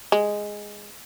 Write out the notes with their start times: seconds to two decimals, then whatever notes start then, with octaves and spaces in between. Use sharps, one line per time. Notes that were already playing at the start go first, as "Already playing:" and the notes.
0.12 G#3